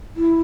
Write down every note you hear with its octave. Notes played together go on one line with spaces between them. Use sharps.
E4